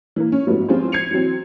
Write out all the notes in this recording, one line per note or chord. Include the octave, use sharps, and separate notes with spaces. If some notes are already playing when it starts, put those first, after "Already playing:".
E3 A#3
C#4
G#2 F3 F#3 A3 B3 E4
F3 C4 C#4 F4 G#4 C5
G#6 C7 C#7 F7
E3 F#3 C4